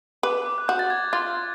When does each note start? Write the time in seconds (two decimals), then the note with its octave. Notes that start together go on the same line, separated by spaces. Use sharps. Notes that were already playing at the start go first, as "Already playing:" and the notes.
0.23 B4 D6
0.46 D6
0.58 F#6
0.68 F#4 G6
0.79 A6
0.90 G#6
1.13 F4 A6